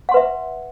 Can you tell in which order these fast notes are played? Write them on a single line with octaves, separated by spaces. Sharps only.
F#5 C6 B4 E5